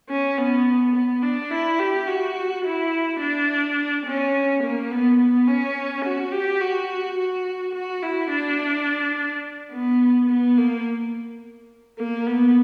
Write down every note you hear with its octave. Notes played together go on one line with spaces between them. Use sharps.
C#4
B3
B3
D4
E4
G4
F#4
E4
D4
C#4
A#3
B3
B3
C#4
F#4
G4
F#4
F#4
F#4
E4
D4
B3
B3
A#3
A#3
B3